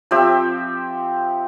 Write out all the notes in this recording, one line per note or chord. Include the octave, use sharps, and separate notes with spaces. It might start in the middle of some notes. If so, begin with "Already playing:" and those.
F3 C4 G4 E5